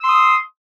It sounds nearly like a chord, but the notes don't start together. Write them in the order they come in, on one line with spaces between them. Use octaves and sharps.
E6 C6 D#6